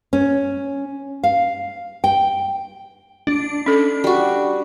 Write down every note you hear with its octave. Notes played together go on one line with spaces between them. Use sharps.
C#4
F5
G5
D4
C#4 A4
G3 F#4